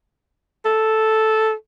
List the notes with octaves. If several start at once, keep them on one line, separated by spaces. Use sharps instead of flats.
A4